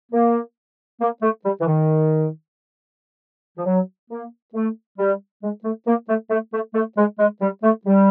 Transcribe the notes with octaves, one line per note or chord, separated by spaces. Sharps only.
A#3
A#3
A3
G3
E3
D#3
F3
F#3
A#3
A3
G3
G#3
A3
A#3
A3
A3
A3
A3
G#3
G#3
G3
A3
G3